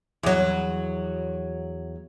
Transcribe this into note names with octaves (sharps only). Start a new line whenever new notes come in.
E2 F#3